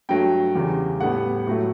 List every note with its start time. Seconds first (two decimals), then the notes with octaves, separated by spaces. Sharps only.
0.09 G2 F#3 A3 G5
0.55 E2 C#3 G3
1.00 A2 G3 B3 F#5
1.47 A2 F#3 A3